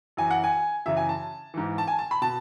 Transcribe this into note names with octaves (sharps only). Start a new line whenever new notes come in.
F#2 E3 G#5
F#5
G#5
F#2 C#3 E3 E5
G#5
A5
G#2 E3
A5
G#5
A5
B5
B2 A5